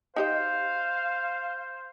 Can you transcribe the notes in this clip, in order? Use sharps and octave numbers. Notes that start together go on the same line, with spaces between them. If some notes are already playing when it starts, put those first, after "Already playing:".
D#4 G4 C5 D#5 F5